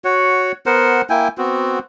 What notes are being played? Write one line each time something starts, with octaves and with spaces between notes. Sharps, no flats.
F#4 C#5 F#5
B3 A#4 C5 F#5
A#3 E4 G5 G#5
B3 C4 F#4